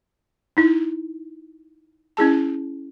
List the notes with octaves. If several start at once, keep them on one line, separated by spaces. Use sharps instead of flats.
D#4 E4
C#4 E4 G#4 A5